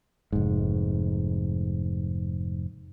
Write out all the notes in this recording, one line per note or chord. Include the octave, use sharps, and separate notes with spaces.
F1 G#2